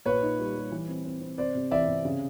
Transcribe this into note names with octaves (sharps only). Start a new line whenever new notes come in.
A#2 B4 C#5
D#4
G3
G3
E3
C4
C4
C4
C3 C5 D5
C3
E3 D5 E5
C3
C#3